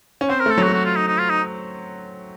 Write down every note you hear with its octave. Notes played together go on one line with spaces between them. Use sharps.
C#4
C4 C5
A#4
A3
A4
F#3 F#4
A3
F#4
F4
D#4
D#4
F4
D#4